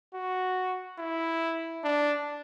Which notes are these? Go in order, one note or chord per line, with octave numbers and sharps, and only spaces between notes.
F#4
E4
D4